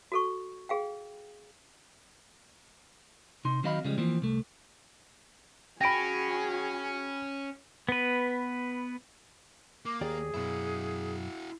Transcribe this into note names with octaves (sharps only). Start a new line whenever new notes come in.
F#4 A4 C#6
G#4 F5 G5
C3 D#4 C6
D#3 F#3 C4 D#5 F5 B5
C#3 F3 G3 G#3
E3 F3 A#3 C4
C2 A3
C#4 F#4 G#4 G5 B5 A#6 D7
B3 B4
A#3 D6
D#2 G4 G#4 D5
F#2 B2 E4 F#4